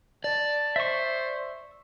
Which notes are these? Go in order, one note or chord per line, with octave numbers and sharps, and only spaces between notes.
D5 A5
C5 E5 C#6